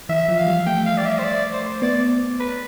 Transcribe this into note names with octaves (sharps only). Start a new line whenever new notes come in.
E3 E5
F3 E5
F5
G3
A3 G5
F5
D5
E5
C5
D5
C5
B3 D5
B4